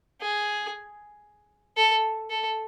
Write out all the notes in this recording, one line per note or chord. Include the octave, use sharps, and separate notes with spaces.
G#4
A4
A4